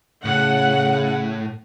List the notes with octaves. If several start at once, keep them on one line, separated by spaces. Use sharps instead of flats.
A2 C#3 F#5